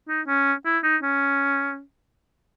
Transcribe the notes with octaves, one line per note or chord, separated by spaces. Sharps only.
D#4
C#4
E4
D#4
C#4